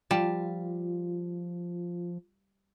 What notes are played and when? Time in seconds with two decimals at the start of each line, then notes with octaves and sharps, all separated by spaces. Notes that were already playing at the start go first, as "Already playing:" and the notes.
0.11 F3 G3 F4 A5